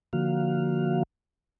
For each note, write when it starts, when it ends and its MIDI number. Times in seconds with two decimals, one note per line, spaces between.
0.13 1.03 50
0.13 1.03 53
0.13 1.03 58
0.13 1.03 66
0.13 1.03 77